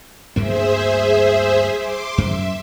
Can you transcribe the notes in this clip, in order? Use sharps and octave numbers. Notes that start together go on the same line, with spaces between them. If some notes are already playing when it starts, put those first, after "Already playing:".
D2 G2 A#3 G#4 C5 E5
C6 D6
F#2 E5